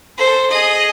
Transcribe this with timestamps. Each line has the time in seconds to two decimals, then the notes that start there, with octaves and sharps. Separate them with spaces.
0.18 A4 C5
0.51 G#4 D#5